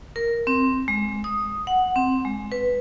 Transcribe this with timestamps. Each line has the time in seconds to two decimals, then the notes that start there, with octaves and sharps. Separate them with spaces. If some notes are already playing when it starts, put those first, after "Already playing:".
0.16 A#4
0.47 C4
0.88 G#3
1.24 D#6
1.67 F#5
1.96 C4
2.25 G#3
2.52 B4